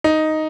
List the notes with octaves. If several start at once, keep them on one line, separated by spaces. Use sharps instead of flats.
D#4